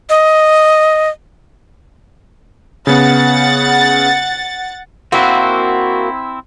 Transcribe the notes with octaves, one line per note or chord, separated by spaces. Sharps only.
D#5
C#3 B3 F#5 A6
A#3 C4 E4 F#4